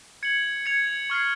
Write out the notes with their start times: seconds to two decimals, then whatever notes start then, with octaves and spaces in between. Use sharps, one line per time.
0.23 G#6 C#7 F#7
0.66 G#6 C#7 F7
1.10 C#6 F6 G#6 C7